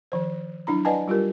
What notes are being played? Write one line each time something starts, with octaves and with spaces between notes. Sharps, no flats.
D#3 F3 C5
F#3 D4 E4 A#5
B4 D5 D#5 F#5 G#5 A5
G3 F4 G4 A#4